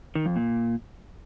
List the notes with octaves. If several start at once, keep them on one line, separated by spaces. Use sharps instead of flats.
D#3
F2
A#2